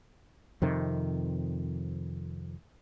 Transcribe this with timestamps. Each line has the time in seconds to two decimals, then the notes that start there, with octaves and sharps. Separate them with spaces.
0.62 F2 C3 D#3